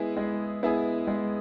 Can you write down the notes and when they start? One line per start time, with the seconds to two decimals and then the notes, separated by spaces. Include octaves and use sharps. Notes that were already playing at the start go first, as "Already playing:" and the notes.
Already playing: G#3 B3 E4 G#4
0.17 G#3
0.63 B3 E4 G#4
1.07 G#3